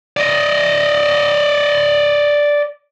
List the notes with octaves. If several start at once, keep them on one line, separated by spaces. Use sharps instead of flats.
D5 D#5